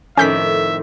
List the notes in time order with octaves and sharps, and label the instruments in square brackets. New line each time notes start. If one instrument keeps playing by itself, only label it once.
[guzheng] F2 A2 D#3 [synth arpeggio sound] C#4 G6 B6 [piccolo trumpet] E5